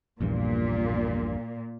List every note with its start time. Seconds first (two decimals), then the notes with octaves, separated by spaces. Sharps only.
0.21 A#1 E2 G2 A#2